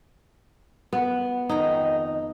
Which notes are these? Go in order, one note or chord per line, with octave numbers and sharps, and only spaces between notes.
B3
F2 D#3 D#4 D#5